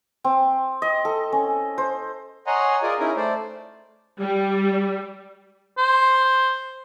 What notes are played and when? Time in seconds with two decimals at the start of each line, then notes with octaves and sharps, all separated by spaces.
0.24 C4
0.82 D#5
1.05 A4
1.32 C#4
1.78 C5
2.47 C#5 D#5 F#5 G#5 A#5 C6
2.82 F4 G#4 A#4 D5 D#5 G#5
3.00 C#4 D#4 E4 G#4 A#4
3.17 A3 C5 D5
4.21 G3
5.78 C5